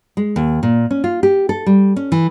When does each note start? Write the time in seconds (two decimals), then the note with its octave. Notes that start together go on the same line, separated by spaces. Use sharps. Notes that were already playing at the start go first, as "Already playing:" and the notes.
0.17 G#3
0.36 D#2
0.63 A#2
0.91 C#4
1.04 F4
1.23 G4
1.49 A4
1.66 G3
1.96 C#4
2.12 E3